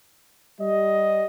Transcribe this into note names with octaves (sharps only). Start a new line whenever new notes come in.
G3 D#5